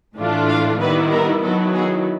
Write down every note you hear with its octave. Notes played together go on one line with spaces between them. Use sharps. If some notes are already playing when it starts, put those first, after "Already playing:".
A2 E3 A3 D4 F4
F5
D#3 G3 B3 E4 B4
A#4
D#3 F#3 B3 E4 A4
G#4